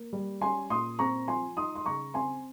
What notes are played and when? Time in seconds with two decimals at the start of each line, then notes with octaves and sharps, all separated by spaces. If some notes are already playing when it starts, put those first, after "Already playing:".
Already playing: A#3
0.13 G3
0.41 C#4 G#5 C6
0.70 A#2 C6 D#6
0.99 C4 A#5 C#6
1.28 F3 G#5 C6
1.57 D#4 C6 D#6
1.75 C6
1.85 C#3 A#5 C#6
2.14 C4 G#5 C6